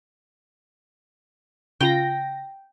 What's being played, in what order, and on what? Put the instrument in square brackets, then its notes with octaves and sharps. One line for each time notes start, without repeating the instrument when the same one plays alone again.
[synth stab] C#3 F4 A#6 [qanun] G5